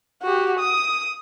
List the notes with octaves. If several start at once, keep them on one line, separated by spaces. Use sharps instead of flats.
F#4 G4
D#6